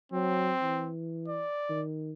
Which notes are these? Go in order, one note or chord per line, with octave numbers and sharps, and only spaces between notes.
F#3 C4
E3
D5
D#3